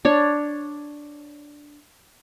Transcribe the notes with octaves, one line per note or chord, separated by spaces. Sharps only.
D4 C#5